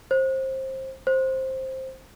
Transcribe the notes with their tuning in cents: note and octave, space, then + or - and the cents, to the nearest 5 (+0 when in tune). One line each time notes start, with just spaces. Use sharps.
C5 +20
C5 +10